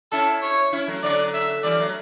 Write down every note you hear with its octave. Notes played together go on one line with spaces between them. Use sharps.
C#4 E4 A4
C#5
C#4 E4
F#3 A3
D3 F#3 D5
E5
E3 G3 D5
F#3 A3